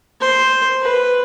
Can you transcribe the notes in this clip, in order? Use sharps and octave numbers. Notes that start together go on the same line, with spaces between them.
C5
B4